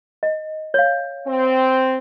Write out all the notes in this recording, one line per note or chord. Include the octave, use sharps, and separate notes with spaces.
D#5
C#5 F5
C4